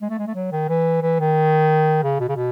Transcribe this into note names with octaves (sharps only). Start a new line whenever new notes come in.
G#3
A3
G#3
A3
F#3
D#3
E3
E3
D#3
C#3
B2
C#3
B2